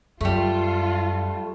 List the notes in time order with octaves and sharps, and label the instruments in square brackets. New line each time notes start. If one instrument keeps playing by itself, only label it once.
[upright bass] F#2 [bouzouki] G3 A3 [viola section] F4